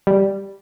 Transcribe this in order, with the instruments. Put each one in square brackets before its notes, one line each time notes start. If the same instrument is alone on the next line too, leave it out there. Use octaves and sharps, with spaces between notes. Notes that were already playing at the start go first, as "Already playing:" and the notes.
[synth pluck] G3